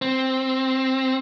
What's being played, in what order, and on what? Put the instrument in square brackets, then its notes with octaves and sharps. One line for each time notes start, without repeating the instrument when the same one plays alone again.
[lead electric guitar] C4